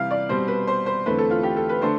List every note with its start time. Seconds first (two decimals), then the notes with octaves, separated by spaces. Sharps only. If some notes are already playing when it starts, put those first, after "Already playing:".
Already playing: C3 E3 G3 F5
0.11 D5
0.29 B2 G3 C4 C5
0.48 B4
0.67 C5
0.86 C5
1.06 E2 D3 A3 C4 B4
1.18 A4
1.31 F4
1.43 G4
1.57 A4
1.69 B4
1.81 D3 A3 D4 A4 C5